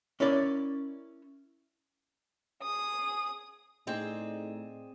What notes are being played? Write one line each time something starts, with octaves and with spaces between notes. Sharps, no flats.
C#4 E4 A#4 D5
G#4 D#6
A2 C4 D#4 G#4 D5